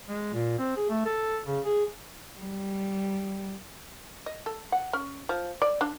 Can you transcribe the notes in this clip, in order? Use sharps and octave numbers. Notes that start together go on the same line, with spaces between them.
G#3
A#2
C4
G#4
A3
A4
C#3
G#4
G3
D#5
A4
F#5
C#4
F3
D5
D4